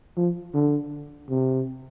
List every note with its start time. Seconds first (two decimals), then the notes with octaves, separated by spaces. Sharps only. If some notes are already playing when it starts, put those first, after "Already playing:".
0.17 F3
0.54 D3
1.29 C3